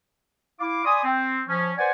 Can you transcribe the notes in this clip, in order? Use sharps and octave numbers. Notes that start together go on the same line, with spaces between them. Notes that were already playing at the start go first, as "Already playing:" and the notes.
E4 F5 D6
D5 G#5 B5 C6 D6 D#6
C4
F3 C#4
B4 C5 D5 F#5 G#5